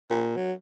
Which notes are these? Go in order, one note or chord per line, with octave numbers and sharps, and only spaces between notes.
A#2
F#3